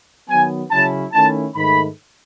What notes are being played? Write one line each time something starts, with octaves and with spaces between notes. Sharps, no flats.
D#3 F#3 B3 G#5
C#3 F#3 C#4 E4 A5
D#3 A3 C#4 E4 A5
G#2 D#3 A3 B5